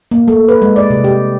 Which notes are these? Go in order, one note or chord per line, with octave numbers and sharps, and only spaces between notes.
A#3
A3
B4
G#3
D5
C3
G4